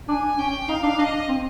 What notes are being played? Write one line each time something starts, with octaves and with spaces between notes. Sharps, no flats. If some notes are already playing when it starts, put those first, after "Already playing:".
D4 G#5
C#4 G5
D#4 F5
D4
D4 D#5
C4